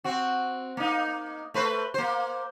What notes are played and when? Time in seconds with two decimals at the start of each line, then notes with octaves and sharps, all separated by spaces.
0.04 C4 F#4
0.77 A#3 D#4
1.54 A3 B4 C5
1.94 A#3 C5